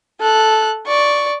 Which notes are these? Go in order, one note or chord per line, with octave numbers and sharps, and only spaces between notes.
A4 F#6
D5 C#6